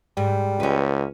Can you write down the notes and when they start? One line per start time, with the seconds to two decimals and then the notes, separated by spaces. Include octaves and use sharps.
0.17 G#2 G3
0.60 C#2 C#4 B4